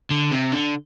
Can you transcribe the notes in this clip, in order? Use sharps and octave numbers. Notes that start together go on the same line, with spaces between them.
D3
C3
D3